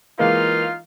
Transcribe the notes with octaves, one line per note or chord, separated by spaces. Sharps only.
E3 G#3 A#3 D#4 F4 F5